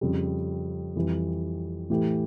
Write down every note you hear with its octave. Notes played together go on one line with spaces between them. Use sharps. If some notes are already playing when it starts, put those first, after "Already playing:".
F2 C#3 G3
F2 E3 G3
A2 E3 A3 E4 G4